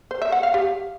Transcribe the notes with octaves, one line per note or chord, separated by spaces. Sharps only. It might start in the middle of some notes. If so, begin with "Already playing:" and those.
C5
E5
F#5
F5
G4